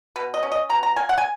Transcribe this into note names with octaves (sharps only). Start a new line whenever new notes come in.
B2 B4
D#5
C#4
D#5
B2 A#5
A#5
A#3 G#5
F#5
G#5